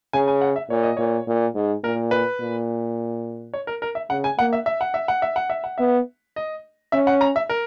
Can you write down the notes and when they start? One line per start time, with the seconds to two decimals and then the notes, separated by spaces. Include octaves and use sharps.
0.13 C#3 G#5
0.28 G#5
0.41 F#5
0.56 E5
0.70 A#2 C#5
0.83 D#5
0.97 A#2 C#5
1.27 A#2
1.55 G#2
1.84 A#2 A#4
2.11 B4
2.40 A#2
3.54 C#5
3.67 A#4
3.82 A#4
3.95 E5
4.10 C#3 F#5
4.24 G#5
4.39 A#3 F#5
4.53 E5
4.66 E5
4.81 F#5
4.94 E5
5.08 F#5
5.22 E5
5.36 F#5
5.50 E5
5.64 F#5
5.78 B3 E5
6.36 D#5
6.92 C#4 E5
7.07 F#5
7.21 A#5
7.36 E5
7.49 A#4